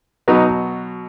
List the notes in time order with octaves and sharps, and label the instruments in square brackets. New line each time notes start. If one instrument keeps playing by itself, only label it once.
[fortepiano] B2 F#3 B3 D#4